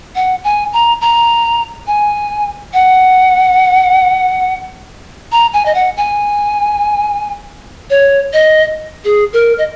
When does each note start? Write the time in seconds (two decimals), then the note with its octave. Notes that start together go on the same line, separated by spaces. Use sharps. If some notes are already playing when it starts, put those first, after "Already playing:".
0.15 F#5
0.44 G#5
0.73 A#5
1.01 A#5
1.87 G#5
2.73 F#5
5.32 A#5
5.53 G#5
5.66 D#5
5.75 F#5
5.97 G#5
7.90 C#5
8.33 D#5
9.04 G#4
9.33 A#4
9.58 D#5